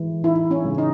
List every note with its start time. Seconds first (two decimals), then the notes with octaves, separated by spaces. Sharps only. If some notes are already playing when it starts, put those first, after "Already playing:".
Already playing: E3 G#3
0.24 D#4 E4
0.51 C#4
0.64 C#3
0.78 D#4